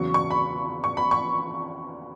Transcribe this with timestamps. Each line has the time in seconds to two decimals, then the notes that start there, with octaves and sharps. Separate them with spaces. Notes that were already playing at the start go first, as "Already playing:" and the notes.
Already playing: E2 C#3 F#3 C#6
0.14 C#6
0.30 B5
0.84 C#6
0.97 B5
1.11 C#6